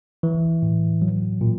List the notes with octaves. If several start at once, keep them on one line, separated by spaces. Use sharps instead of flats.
E3
A2
F#3
A#2